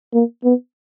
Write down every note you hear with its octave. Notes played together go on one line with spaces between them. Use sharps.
A#3
B3